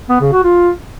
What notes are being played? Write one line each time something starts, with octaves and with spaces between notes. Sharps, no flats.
B3
C#3
F#4
F4